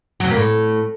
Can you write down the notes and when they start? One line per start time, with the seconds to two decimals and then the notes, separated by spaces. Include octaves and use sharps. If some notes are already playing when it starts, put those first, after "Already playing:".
0.20 F#3
0.26 C3
0.31 A#3
0.36 A2